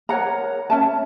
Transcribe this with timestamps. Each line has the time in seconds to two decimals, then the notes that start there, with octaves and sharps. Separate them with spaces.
0.09 A#4 C#5 F#5 A#5
0.70 C#4 E5 A5